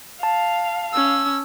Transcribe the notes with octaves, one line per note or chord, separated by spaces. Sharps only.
F5 A5
C#4 E6